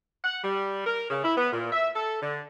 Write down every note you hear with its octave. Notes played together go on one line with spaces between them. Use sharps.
F#5
G3
A#4
C#3
E4
B3
A#2
E5
A4
D3